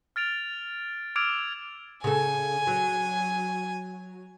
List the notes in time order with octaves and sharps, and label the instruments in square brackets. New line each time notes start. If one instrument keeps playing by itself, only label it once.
[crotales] F6 A6 D7 F7
D6 E6 F6 G#6 D7 F7
[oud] C#3 A4 [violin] G#5
[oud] F#3